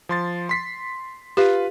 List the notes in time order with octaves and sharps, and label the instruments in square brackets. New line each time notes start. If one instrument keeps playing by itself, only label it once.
[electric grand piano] F3 C6 A6
C6 B6 C7
[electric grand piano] F4 B4 F5 [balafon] G4